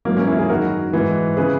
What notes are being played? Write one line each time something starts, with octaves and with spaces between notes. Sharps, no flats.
G#2 E3 F#3 A#3
A#3 C#4
C#4 E4
E4 G#4
F#2 D#3 F#4 A#4
G#2 E3
C#3 E3 G#4 B4